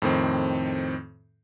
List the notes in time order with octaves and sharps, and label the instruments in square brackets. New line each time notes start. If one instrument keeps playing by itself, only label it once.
[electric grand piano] F2 A2 D#3 C4